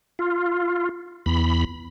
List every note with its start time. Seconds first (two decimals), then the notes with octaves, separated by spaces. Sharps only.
0.19 F4
1.26 E2 B5